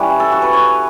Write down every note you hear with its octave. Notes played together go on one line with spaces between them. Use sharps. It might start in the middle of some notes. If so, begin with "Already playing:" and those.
Already playing: E3 G3 C#4 B4
A4
F#4
B4
C#5